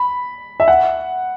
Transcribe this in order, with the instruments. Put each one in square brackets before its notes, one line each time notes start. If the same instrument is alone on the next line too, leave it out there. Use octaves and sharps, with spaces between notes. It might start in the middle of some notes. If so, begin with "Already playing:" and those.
Already playing: [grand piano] B5
E5
F#5